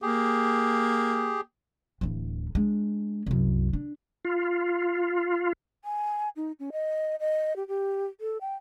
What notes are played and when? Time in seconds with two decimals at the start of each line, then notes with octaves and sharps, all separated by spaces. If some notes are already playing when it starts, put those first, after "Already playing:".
0.02 A#3 G4 G#4
2.01 D1 E3
2.55 G#3 D4
3.26 C2 F#2
3.73 D4
4.25 F4
5.85 G#5
6.36 D#4
6.59 C#4
6.72 D#5
7.20 D#5
7.56 G4
7.68 G4
8.21 A4
8.41 G5